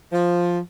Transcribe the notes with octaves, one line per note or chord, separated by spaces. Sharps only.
F3